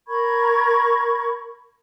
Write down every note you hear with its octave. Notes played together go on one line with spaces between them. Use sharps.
A#4 B5 C#6 G#6